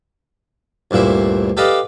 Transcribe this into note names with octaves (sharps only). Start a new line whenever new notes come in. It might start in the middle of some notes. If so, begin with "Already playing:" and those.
D2 G2 A#2 E4 C5
G4 A4 B4 D5 D#5 F5